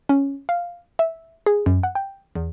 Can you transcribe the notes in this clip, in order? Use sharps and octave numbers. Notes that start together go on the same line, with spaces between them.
C#4
F5
E5
G#4
F#2
F#5
G5
E2